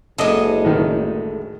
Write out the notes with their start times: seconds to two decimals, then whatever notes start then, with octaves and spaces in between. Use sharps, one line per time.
0.18 F#1 D2 G#3 A4 D#5
0.65 A2 D#3